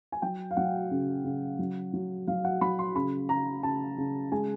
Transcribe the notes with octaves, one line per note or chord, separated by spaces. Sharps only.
G#5
F#3 G5
F5
F#3 F#5
C#3
C#3
F#3
F#3
F#3 F5
F#5
F#3 B5
C6
C#3 B5
C#3 A#5
C#3 A5
C#3
G#3 G#5